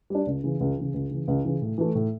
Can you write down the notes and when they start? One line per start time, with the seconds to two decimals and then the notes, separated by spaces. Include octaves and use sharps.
0.10 G3 D4
0.27 C#2
0.44 C#3 E3
0.60 C#2
0.77 C#3 E3
0.94 C#2
1.11 C#3 E3
1.28 C#2
1.45 C#3 E3
1.62 A2
1.78 E3 A3
1.95 A2